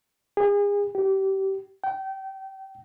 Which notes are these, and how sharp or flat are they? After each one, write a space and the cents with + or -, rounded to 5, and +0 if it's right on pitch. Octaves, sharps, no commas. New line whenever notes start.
G#4 -35
G4 -25
G5 -25